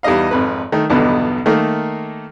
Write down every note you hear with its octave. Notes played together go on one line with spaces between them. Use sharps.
E2 G3 D#4 D#5 F5
G#1 F2 B4
D#3 A3
B1 E2 G2 B2 D3 B3
D#3 A3 A#3